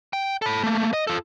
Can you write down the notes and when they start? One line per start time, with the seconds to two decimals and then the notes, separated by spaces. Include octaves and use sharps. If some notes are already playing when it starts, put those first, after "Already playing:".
0.13 G5
0.42 A4 B5
0.63 A3 A#3
0.93 D#5
1.07 F4 A4